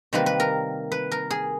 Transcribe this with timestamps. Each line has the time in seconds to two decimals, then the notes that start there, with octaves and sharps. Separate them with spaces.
0.13 C3 D#3 G3 A#3 B4
0.26 B4
0.40 A#4
0.92 B4
1.12 A#4
1.30 G#4